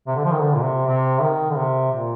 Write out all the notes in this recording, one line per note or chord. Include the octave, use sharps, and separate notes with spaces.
C3
D3
F3
D#3
D3
A#2
C3
C3
D#3
D3
C3
A#2